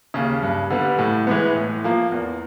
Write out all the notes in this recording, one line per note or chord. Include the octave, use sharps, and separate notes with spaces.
D#2 C#3
G2
D3 G3 B3
A2
E3 G#3 B3
A2
F3 A#3
E2